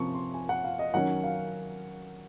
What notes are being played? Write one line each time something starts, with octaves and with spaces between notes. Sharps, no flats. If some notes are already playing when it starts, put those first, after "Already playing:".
Already playing: C3 F3 A#3 C#4 C#6
C6
G#5
F#5
F5
D#5
D#3 F#3 C#4 F#5
F5